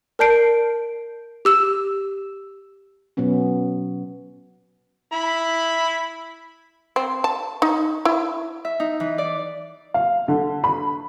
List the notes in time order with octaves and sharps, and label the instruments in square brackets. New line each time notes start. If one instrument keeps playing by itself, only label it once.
[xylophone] A#4 D5 A5 G6 C7 D7
G4 E6 E7
[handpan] B2 F#3 B3 C#4
[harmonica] E4 B5
[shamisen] C4
A5
D#4
E4
[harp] E5
D#4
E3
D5
[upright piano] F5
D3
B5